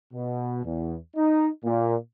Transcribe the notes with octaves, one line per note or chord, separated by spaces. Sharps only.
B2
E2
D#4
A#2